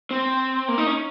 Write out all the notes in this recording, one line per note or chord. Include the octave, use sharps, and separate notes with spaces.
C4
A#3
D#4
C#4